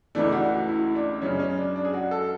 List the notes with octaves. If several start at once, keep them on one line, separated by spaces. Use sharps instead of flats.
C#2 C#3 E3 A3 D4
F#4
F#4
E4
D4
F#2 C#3 G#3 C#4
C#4
D4
D4
G#4
F#4
A4